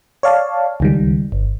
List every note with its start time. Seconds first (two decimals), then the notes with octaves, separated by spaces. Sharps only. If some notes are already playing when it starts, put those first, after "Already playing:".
0.23 C#5 D5 F5 A5
0.80 C#2 D#3 G3
1.32 G1